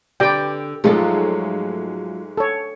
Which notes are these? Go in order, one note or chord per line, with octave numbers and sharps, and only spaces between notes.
D3 G4 B4 D5 G5
G#2 F3 F#3 G#3 A3 A4
A4 C#5